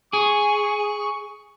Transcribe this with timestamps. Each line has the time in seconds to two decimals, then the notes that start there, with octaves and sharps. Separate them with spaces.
0.13 G#4 C#6